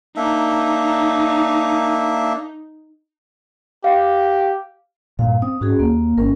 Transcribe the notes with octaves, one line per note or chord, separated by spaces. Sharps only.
A#3 D4 D#4 E5
G4 F5
G2 A#2 F5
C4 D#6
G#2 C#4 F#4 G#4
D#2 A#3
G#1 C#4 A#4